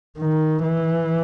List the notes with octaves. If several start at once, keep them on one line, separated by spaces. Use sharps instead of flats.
D#3
E3